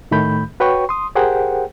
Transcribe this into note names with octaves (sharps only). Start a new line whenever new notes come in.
A2 D#3 A3 B5 G6
F#4 B4 C#5 G5 C#6
C6 D#6
G4 G#4 A#4 C5 F#5 G5